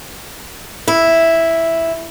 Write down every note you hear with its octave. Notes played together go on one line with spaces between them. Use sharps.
E4